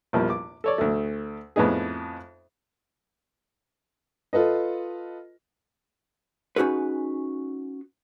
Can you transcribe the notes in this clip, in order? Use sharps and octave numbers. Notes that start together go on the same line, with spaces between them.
A#1 E2 F3 G3 A#3
D6
A4 C#5 D5
D2 A3
F2 A2 B3 D#4 G#4
F4 A4 B4 D#5
C#4 D#4 F#4 G#4 B4